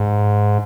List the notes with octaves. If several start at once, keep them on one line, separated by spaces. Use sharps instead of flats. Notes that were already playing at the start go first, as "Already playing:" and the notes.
Already playing: G#2